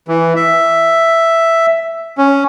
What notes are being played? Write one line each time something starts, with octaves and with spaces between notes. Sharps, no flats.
E3
E5
C#4